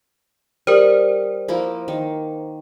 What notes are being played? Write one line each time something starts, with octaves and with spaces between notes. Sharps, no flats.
G3 A#4 C5
F3 A#3 E4
D#3